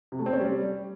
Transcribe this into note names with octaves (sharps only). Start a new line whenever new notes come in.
C3
A3
C4
C#4
G3